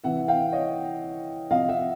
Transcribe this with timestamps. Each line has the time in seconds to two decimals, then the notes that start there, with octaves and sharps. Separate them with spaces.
0.04 C3 E3 E5 F#5
0.28 F5 G5
0.52 C#5 D#5
1.51 C3 F3 D#5 F5
1.68 E5 F#5